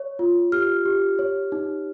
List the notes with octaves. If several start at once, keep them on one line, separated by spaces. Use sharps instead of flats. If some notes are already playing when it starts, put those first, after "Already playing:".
Already playing: C#5
F4
G4 F6
G4
C#5
D#4